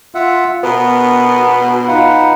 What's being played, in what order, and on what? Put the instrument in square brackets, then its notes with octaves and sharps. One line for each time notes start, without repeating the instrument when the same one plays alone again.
[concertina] F4 E5 F#5
[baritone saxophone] B2 [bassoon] B3 [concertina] A#4
[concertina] D#4 B4 F#5 [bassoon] F4